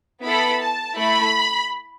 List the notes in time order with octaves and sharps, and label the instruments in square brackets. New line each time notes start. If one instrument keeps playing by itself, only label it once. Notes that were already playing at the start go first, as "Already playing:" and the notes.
[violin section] B3 E4 A4 B5
A5
A3 E4 A4 B5